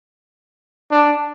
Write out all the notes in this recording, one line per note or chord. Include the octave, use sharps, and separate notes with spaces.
D4